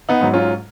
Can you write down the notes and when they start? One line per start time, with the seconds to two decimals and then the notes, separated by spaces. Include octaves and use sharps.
0.09 B3 D#4
0.21 G#2 F#3
0.34 C#4 F4